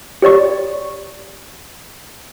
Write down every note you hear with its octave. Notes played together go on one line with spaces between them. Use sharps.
G4 C#5 D5 C#6